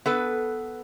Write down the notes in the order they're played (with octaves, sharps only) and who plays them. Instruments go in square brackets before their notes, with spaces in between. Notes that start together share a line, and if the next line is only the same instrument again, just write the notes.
[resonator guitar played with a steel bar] B3 A4 B4